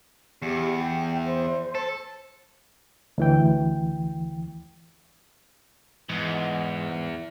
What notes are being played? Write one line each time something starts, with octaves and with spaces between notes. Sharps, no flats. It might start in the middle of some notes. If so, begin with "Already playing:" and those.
E2 G4
G5
C5
A4
D2 E3 G5
E2 G#2 E3